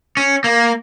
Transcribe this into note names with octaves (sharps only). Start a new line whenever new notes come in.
C#4
A#3